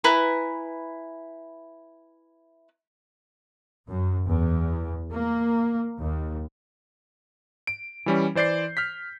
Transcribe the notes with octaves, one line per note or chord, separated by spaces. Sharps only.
E4 B4 G#5 A#5
F#2
E2
A#3
D#2
D7
E3 G3 C#4
E3 C5 D5 G6 C7
F6 G6 B6